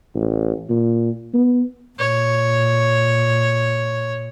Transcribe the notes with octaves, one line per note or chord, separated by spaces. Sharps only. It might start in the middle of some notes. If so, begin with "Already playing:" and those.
A1
A#2
B3
A#2 C#5